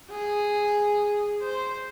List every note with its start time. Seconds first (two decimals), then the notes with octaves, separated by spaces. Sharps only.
0.11 G#4
1.42 C5